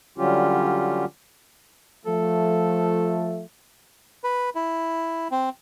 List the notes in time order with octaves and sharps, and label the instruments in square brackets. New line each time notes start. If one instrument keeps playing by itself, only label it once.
[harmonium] D3 F#3 G3 C#4 F4 G4
[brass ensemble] F3 A3 [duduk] A4
[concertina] B4
E4
C4